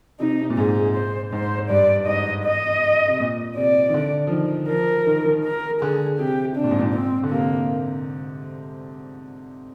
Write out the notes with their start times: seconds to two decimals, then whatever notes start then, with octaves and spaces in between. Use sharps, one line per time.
0.19 C3 D#4
0.41 C3
0.50 A#2
0.57 G#2 G#4
0.95 C5
1.32 G#2 C5
1.70 G2 D5
2.07 G#2 D#5
2.44 D#5
3.08 C3
3.20 A#2
3.56 C3 D5
3.89 D#3
3.94 D3
4.27 F3
4.32 D#3
4.69 F3 A#4
5.07 D#3
5.26 D#3
5.45 A#4
5.81 D3 G#4
6.19 C3 G4
6.56 C3 D4
6.64 A#2
6.71 G#2
6.79 A#2
6.94 C4
7.23 D3
7.31 C3 A#3